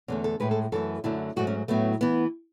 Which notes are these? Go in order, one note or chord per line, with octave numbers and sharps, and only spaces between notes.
E2 D3 A3 C#4
A4
A2 G#3 B4
A4
F#2 E3 A3 A4
F#2 D3 F#3 A3 E4
G#2 F#3 A3 F#4
C#4
A2 F#3 A3 B3
E3 B3